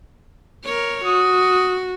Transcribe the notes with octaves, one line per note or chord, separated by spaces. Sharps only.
A#4 C#5
F#4 D#6